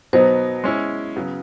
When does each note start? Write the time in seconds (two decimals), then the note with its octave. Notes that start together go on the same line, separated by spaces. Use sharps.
0.13 B2 F#3 B3 D#4 C5
0.64 G#3 C#4 E4
1.16 C#3 F#3 B3